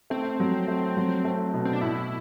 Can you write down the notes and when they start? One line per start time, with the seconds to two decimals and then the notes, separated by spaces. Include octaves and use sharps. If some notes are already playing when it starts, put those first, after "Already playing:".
0.10 A3 C4
0.40 F#3
0.68 A3
0.97 F#3
1.25 A3
1.53 B2
1.65 C4
1.73 D4
1.81 A2 E4